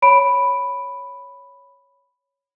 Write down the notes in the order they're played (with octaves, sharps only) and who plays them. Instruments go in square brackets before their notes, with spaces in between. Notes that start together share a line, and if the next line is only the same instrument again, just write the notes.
[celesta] C#5 B5 D7